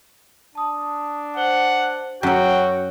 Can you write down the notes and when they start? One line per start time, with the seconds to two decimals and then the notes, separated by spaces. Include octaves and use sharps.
0.55 D4 A5 D#6
1.37 C5 F#5 G7
2.23 F#2 C#4 F#4 G5 E6 F#6